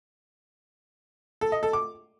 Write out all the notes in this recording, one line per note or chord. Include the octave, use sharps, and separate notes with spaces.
A4
D#5
A4
D6